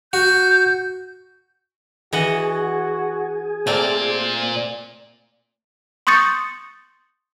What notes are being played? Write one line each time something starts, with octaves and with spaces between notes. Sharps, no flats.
F#4 G6
E3 F#4 G#4 D#5 F#5
A#2 A3 A#3 C4 C5 D5
C6 C#6 D#6 G6 A6 C#7